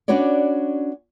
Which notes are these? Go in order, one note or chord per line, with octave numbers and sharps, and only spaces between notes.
C#4 D4 F#4 B4 C#5 D5